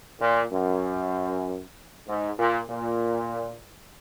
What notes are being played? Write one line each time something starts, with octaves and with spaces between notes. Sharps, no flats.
A#2
F#2
G#2
A#2
A#2